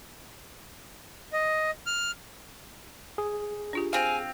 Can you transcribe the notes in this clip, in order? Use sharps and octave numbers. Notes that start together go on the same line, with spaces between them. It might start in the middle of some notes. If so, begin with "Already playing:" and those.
D#5
F6
G#4
D4 F4 G4
C4 F5 G#5